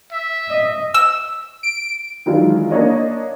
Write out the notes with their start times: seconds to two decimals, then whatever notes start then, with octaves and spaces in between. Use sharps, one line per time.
0.12 E5
0.49 D#5
0.94 E6
1.63 D7
2.26 D#3 E3 F#3 G#3 D4 F4
2.71 A#3 D4 C#5 D#5